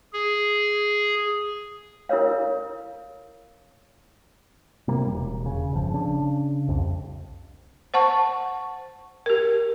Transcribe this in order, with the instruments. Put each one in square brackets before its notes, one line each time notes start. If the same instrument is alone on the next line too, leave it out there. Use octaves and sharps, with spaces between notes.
[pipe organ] G#4
[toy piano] E4 A4 A#4 C#5 F5
[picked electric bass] C3 G3 A#3
E1
C#3
G1 F3
C#3 D4
C2 F2
[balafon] C5 F#5 A5 C#6
G4 A#4